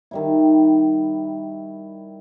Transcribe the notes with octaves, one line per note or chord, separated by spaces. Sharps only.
D#3 G3 E4